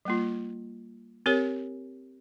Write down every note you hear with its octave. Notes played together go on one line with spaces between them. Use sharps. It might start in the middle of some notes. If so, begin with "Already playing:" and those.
G3 A#3 F4
C4 G4 A#4 C#5